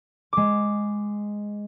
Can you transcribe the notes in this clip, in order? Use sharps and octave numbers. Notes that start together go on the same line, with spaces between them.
G#3 D6